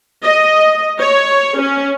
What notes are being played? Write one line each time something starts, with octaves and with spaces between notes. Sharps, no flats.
D#5
C#5
C#4